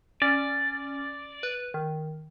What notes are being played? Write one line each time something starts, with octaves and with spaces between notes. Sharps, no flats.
C#4 D5
B4
D#3